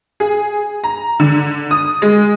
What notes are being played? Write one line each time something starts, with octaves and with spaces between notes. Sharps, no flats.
G#4
A#5
D3
D#6
G#3